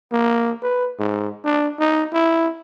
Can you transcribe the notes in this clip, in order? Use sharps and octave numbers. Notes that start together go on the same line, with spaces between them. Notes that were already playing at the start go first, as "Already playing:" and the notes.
A#3
B4
G#2
D4
D#4
E4